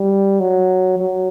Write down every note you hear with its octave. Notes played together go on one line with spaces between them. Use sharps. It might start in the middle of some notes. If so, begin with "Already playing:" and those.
Already playing: G3
F#3
F#3